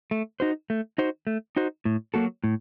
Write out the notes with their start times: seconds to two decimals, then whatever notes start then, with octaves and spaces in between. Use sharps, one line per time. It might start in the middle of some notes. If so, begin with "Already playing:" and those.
0.11 A3
0.40 D#4 F#4 C5
0.70 A3
0.98 D#4 F#4 C5
1.27 A3
1.56 D#4 F#4 C5
1.85 A2
2.14 F#3 A#3 F#4 A4
2.44 A2